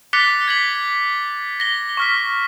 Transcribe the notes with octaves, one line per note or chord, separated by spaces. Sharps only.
D6 F#6 A6 B6 C#7 G7
G#6 B6 F#7
A#6 G7
C#6 F6 B6